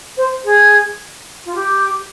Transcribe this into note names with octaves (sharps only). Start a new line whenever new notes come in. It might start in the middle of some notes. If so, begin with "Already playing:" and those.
C5
G#4
F4
G4